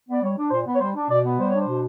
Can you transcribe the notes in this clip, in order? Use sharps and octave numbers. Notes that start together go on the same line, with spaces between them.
B3 D5
G3 C#5
D4
A#2 C5
B3
C#5
G3 C5
D4
B2 D5
B3
G3 C5
D4 C#5
C5
B2